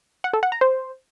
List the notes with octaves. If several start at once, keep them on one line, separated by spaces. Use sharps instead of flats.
F#5
A4
F#5
A#5
C5